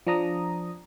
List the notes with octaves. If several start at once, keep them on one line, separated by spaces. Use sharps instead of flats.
F3 D4 A#5 D#6